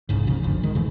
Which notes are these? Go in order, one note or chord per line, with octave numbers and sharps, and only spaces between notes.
E1 C2 G#2 C#3
A#2 C#3 F3
G1 D2 F3
D#3 G#3
F#2 C#3 E3 A3